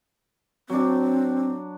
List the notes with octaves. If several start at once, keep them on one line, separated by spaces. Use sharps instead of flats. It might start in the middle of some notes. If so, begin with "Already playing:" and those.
F#3 C4 D4